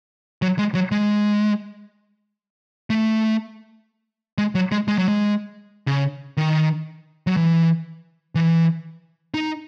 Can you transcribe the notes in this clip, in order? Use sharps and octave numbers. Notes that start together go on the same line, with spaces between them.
F#3
G#3
F#3
G#3
A3
G#3
F#3
G#3
G#3
F#3
G#3
C#3
D#3
F#3
E3
E3
D#4